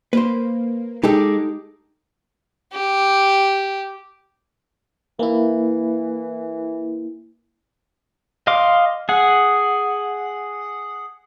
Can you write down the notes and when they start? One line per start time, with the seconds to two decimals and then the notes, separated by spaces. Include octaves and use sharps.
0.13 A#3 B4 C5
1.04 G#3 D#4 G4 A4 D6
2.73 G4
5.19 E3 A#3 E4
8.47 D#5 F5 C6 D6
9.09 G#4 F#5